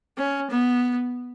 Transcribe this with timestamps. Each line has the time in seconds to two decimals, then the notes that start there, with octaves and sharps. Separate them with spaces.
0.18 C#4
0.50 B3